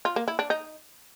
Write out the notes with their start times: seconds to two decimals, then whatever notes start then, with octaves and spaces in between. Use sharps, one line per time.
0.05 F4
0.16 A#3
0.28 E4
0.39 D4
0.50 D#4